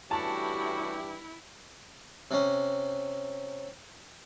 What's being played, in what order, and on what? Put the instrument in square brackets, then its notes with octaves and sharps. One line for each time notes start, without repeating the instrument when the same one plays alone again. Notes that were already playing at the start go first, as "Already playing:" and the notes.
[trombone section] G2 E3 G4 [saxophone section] A3 C#4 F#4 [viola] E4 [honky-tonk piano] A5
[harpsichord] C3 C#4